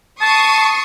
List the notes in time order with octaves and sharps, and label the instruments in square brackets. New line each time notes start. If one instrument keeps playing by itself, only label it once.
[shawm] A5 [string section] C#6 D#6 C7